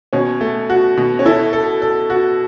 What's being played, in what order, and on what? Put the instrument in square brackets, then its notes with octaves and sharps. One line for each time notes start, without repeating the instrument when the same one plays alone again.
[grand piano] B2 [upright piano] C#4
[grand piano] A3
F#4
B2
[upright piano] C#4
[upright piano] E4 [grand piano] A4
[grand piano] A4
A4
F#4